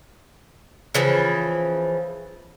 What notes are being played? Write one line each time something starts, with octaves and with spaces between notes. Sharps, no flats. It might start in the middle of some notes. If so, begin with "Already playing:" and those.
C#3 E3 F3